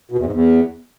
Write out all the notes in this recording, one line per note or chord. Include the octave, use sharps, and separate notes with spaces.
B2
E2
G#2
E2